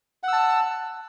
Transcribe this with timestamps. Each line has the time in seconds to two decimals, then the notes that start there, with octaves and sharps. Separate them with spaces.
0.23 F#5
0.28 E6
0.33 A5